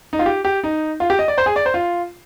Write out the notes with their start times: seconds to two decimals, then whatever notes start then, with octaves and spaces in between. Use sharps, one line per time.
0.13 D#4
0.19 F4
0.26 G4
0.45 G4
0.64 D#4
1.00 F4
1.10 G4
1.19 D#5
1.28 D5
1.38 C5
1.46 G#4
1.56 D5
1.66 C5
1.74 F4